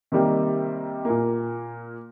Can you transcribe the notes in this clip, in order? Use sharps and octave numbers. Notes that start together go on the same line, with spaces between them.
C3 D#3 G3 A#3
A#2 A#3